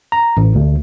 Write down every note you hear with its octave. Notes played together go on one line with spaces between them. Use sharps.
A#5
A1
D2